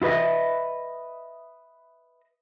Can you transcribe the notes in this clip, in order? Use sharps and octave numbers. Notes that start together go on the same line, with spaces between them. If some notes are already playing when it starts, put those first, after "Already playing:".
E4 F4 B4 D#5 E5